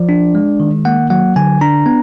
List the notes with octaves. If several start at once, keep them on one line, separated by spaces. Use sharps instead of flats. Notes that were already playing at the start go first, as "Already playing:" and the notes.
Already playing: F3 D5
D4
G#3
D#3
A#3 F#5
F#3 F#5
D3 G#5
D4 A#5
B3